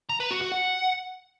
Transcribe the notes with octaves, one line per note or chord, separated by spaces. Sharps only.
A#5
B4
F#4
F#4
F#5